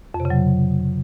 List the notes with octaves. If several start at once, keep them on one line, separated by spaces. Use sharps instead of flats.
F2
C3
C#3
F#3